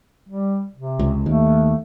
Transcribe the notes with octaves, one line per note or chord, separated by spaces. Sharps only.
G3
C3
C#2
D#2 A3